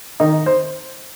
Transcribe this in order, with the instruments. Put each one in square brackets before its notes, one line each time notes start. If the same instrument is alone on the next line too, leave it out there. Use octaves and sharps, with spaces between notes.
[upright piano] D#3 [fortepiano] D#4
[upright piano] C5